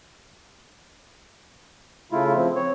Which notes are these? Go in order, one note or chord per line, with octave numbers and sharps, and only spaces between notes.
C#3 A3 E4 F4
F3 C4
C4 C#5